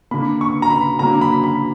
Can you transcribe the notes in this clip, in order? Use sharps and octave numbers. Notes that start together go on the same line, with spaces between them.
D3 A#3 B5
C#6
A#5
B5
D3 F#3 A#3 A#5
B5
B5